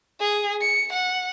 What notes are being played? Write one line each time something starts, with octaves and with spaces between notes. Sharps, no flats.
G#4
C#7
F#5